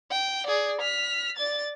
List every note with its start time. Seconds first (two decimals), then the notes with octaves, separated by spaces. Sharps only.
0.11 G5
0.47 G#4 D5
0.81 F6 B6
1.37 D5 A6